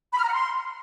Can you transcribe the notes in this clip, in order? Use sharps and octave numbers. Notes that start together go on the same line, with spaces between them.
B5
F6
A#5
F#5
C6